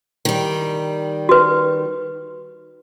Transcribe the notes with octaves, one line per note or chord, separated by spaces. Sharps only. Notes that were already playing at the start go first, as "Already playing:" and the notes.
D#3 G3
F#4 B4